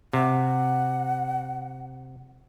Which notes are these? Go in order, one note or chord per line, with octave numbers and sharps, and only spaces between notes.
C3 F#5